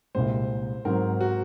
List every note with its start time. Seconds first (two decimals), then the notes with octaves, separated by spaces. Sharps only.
0.15 C2 A#2 G#3 C5
0.85 G#2 F#3 C4 A#4
1.21 F#4